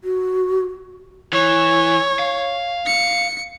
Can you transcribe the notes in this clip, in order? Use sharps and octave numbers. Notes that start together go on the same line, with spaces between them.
F#4
E3 C#5
F5
C#7